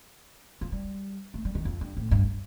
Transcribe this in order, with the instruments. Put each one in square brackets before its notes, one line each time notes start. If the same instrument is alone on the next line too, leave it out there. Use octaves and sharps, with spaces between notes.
[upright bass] F3
G3
A3
G3
D#3
F2
G2
A2
G2